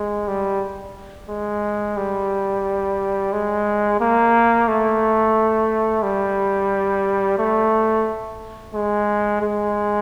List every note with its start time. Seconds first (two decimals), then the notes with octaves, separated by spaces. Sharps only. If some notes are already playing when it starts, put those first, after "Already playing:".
Already playing: G#3
0.28 G3
1.29 G#3
1.97 G3
3.32 G#3
4.00 A#3
4.68 A3
6.03 G3
7.39 A3
8.74 G#3
9.41 G#3